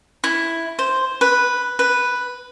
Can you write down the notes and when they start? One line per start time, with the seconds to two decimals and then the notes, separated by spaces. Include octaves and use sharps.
0.24 E4
0.79 C5
1.21 B4
1.79 B4